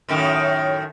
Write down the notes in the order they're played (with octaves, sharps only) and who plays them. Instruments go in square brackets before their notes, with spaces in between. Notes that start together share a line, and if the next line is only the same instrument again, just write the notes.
[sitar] F#2 A2 D#3